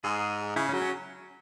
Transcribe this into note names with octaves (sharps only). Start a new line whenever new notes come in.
G#2 G#4
C#3 E4
C#4
F#3
C#4